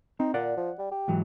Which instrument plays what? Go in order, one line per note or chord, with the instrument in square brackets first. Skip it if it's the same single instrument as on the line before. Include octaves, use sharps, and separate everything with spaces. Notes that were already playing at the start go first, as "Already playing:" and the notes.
[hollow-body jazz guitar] C4 [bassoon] D#4
[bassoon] A#2 [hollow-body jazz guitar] D5 F#5
[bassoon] F3
G3
G4
[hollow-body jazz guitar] G#2 E3 F#3